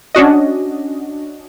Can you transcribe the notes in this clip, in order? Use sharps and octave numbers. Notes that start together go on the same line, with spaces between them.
C#4 D4 F#4 D#5